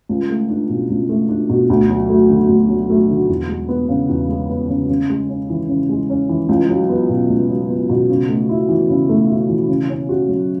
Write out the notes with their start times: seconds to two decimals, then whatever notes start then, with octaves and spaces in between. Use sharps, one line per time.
0.09 C#2
0.30 A3
0.49 D4
0.69 B2
0.90 C#2
1.09 A3
1.29 D4
1.49 B2
1.70 D2
1.90 F#3
2.09 A3
2.30 D3
2.49 D2
2.70 F#3
2.90 A3
3.10 D3
3.29 E2
3.49 G#3
3.69 B3
3.89 C#3
4.09 E2
4.29 G#3
4.49 B3
4.69 C#3
4.89 C#3
5.10 G#3
5.29 C#4
5.50 E3
5.68 C#3
5.89 G#3
6.10 C#4
6.29 E3
6.49 C#2
6.69 F#3
6.89 B3
7.09 B2
7.30 C#2
7.49 F#3
7.70 B3
7.89 B2
8.10 C#3
8.29 A3
8.49 E4
8.69 E3
8.89 C#3
9.09 A3
9.29 E4
9.49 E3
9.68 C#3
9.89 C#4
10.09 F#4
10.29 F#3